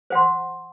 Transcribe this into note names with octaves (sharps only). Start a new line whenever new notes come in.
C5 F#5 C6